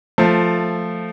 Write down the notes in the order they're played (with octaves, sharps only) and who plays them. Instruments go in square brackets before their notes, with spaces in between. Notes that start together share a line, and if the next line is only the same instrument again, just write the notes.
[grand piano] F3 A3